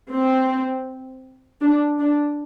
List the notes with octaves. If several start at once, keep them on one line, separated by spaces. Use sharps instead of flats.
C4
D4
D4